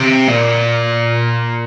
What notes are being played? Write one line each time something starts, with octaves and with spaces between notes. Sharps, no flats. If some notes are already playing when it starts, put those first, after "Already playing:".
Already playing: C3
A#2